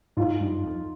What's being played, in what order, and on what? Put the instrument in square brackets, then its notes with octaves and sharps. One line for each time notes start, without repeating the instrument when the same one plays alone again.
[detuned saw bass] G#2 [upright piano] D#4 F4
[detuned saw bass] G2
F2